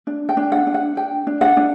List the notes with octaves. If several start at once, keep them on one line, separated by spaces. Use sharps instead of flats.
D4
G5
D4
F#5
D4
F#5
D4 G5
D4
F#5
D4